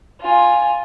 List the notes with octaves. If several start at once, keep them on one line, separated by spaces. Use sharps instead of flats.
F4 G#5